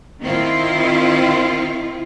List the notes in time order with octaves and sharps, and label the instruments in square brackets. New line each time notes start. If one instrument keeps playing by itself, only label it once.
[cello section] D#3 C4 E4 F4